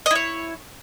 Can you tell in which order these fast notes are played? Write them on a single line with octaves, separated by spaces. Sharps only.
D#5 E4 C#5